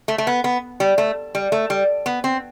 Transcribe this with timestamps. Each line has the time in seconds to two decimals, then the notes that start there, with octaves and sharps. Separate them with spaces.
0.08 A3
0.18 A3
0.27 B3
0.44 B3
0.80 G3
0.98 A3
1.35 G3
1.52 A3
1.70 G3
2.06 B3
2.24 C4